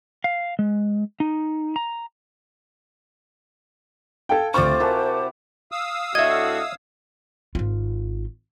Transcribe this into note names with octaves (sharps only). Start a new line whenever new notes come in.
F5
G#3
D#4
A#5
A4 F5 G5 A5 G#6
D2 C3 F4 C5 D5 C#6 F6
E4 F#4 G4 A#4 G#5 A5
F5 D#6 E6
A2 D4 F#4 D#5 E5 G#6
G#1 F4